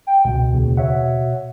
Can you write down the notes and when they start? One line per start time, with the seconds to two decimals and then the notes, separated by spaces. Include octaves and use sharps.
0.07 G5
0.25 C#2 B2
0.53 D#2 C#3
0.77 C#5 E5 F#5